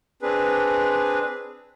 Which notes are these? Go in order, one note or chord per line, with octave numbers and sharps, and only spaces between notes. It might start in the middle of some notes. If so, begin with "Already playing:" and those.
C4 D4 G#4 B4